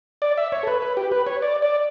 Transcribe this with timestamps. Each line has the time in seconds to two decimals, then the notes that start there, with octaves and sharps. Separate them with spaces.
0.22 D5
0.37 E5
0.52 C#5
0.63 A4
0.67 B4
0.82 B4
0.97 G4
1.11 B4
1.27 C#5
1.42 D5
1.62 D5